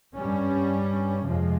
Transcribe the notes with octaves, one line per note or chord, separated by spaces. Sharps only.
G2 G3 C#4
F2 C3 F3 G#3